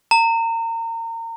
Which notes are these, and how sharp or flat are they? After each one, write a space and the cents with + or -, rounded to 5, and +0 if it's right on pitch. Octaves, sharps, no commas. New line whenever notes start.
A#5 -30